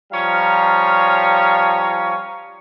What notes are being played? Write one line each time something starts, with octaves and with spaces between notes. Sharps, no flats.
F3 G3 C#4 C#5 F5 A#5